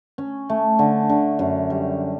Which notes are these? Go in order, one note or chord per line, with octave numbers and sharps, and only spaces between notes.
C#4
A3
D3
D3
F#2
G3